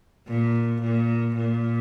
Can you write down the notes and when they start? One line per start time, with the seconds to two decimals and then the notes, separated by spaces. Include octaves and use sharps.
0.28 A#2
0.82 A#2
1.36 A#2